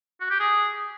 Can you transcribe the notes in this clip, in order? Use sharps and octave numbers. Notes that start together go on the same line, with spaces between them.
F#4
G4
G#4